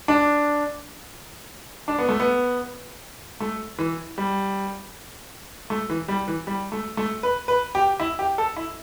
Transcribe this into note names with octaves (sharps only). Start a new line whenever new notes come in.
D4
D4
B3
A3
B3
A3
E3
G3
A3
E3
G3
E3
G3
A3
A3
B4
B4
G4
E4
G4
A4
E4